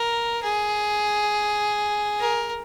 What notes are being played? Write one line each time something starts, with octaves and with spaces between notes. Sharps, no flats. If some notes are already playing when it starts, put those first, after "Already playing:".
Already playing: A#4
G#4
A#4